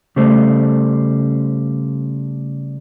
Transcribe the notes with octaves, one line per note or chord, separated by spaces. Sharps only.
C#3 G3 A3 C5